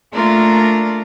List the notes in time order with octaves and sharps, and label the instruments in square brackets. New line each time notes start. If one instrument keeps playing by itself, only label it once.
[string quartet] A3 A#3 D4 F4 A#4 D5